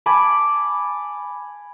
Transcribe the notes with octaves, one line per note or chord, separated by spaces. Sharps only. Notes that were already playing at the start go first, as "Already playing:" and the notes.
G#5 A5 B5 D6